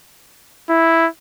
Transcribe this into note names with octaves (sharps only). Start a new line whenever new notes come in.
E4